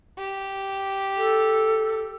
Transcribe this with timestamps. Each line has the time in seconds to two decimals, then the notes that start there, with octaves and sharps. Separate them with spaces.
0.18 G4
1.17 A4